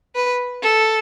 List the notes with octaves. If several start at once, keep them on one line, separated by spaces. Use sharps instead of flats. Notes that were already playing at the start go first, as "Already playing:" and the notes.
B4
A4